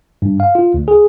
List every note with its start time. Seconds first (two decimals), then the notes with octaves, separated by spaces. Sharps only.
0.22 G2
0.40 F5
0.55 F4
0.74 D2
0.88 G#4